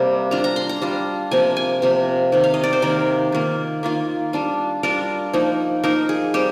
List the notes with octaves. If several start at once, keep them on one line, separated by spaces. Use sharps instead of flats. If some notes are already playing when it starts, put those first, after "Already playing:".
Already playing: C3 G3 A#3
G3 D4 F4 A#5
A#5
C6
A#5
G3 D4 F4
C3 F3 A#3 G#5
G#5
C3 F3 A#3
C3 D#3 A#3
F5
D#5
D5
C5
C3 D#3 A#3 A#4
D#3 A#3 F4
D#3 A#3 F4
G3 D4 F4
G3 D4 F4 A#4
F3 A#3 D#4
F3 A#3 D#4 A#4
G#4
G3 C4 G4